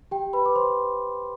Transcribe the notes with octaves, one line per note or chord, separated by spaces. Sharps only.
G4 G5
B4 B5
D6
C5 C6